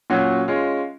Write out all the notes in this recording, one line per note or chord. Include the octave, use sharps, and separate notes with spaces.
A#2 F#3 C#4 F#4
G#3 C#4 F4